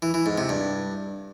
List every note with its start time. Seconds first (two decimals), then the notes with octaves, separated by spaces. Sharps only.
0.02 E3
0.14 E3
0.26 G#2
0.38 C3
0.49 G2